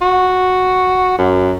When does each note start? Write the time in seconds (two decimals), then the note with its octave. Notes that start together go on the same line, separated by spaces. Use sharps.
0.01 F#4
1.19 F#2